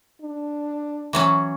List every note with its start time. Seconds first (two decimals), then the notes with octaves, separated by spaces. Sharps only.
0.22 D4
1.13 E3 F#3 C#4